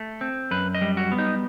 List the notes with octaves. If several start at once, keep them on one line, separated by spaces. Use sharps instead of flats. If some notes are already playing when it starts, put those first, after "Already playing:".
Already playing: A3
C4
F#2 B4
D#5
G3
F#4
B3
D#4